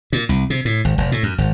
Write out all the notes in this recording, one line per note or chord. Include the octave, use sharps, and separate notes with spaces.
A#2
C2
C3
A2
G#1
F1
A2
F#2
G#1